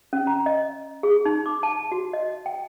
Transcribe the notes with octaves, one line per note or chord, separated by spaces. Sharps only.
C#4
A#5
D#5
G#4
D#4
D6
A5
F#4
D#5
G5